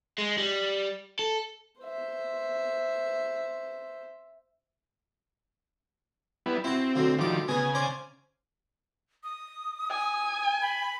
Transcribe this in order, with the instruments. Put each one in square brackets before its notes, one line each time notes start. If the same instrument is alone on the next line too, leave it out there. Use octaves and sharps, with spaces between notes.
[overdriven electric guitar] G#3
G3
A4
[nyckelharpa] C5 E5
[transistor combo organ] G3 B3 E4
[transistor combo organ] C4 [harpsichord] E4 F#4
[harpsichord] D2 D3 F#3
[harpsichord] D2 D6 [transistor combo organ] D#3 F3 G3
[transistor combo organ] C#3 G#5 [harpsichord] B3 G#4
[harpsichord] C#4 C5 D5
[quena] D#6
[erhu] G#5
[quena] B5